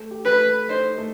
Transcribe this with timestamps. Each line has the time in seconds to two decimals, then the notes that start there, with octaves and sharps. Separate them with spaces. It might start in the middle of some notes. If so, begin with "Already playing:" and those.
Already playing: A3
0.11 G4
0.25 B4
0.40 A3
0.69 D#4 C5
0.98 A3